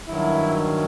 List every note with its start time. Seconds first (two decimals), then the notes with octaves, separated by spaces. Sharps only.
0.07 G2 D#3 F#3 E4